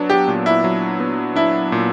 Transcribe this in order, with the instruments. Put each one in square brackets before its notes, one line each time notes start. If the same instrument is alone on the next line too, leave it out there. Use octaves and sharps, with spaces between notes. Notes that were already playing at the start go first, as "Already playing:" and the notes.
Already playing: [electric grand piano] F#3 B3 D4
[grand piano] G4
[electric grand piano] A#2
[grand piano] E4
[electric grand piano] F#3
B3
[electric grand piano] D4 [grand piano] E4
[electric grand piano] A#2